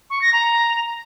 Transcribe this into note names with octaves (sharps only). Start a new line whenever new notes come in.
C#6
A#6
A#5